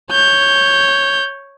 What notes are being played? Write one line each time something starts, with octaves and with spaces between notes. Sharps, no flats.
C#5 G6